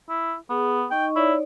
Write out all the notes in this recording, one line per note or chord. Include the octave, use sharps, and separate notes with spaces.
E4
B3 G#4
D#4 D#5 G5 C#6
D#4 E4 C#5 D5